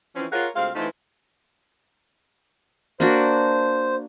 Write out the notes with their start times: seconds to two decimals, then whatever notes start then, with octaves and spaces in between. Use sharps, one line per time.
0.16 E3 F3 C4 C#4
0.32 F4 G#4 A#4 C#5 F5 F#5
0.56 D2 G#3 C4 F4 F5
0.75 E3 A3 B3 C4 D#4 F4
3.00 A#3 D4 F#4 C5